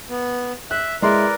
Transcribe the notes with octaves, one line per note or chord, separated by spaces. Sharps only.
B3
E5 F#6
G#3 E4 A#4 B4 D5 C6